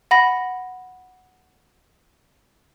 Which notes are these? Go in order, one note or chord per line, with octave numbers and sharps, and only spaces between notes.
F#5 B5 A#6